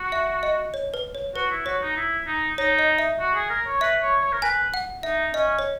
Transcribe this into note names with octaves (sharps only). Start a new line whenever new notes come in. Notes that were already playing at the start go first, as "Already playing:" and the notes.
Already playing: F#4
E5
D#5
C#5
B4
C#5
F#4 B4
E4
F#4 C#5
D#4
E4
D#4
D#4 C#5
D#5
E5
F#4
G#4
A#4
C#5
B4 E5
C#5
C#5
A#4
B4 G#5
F#5
D#4 E5
C#4 D#5
C#5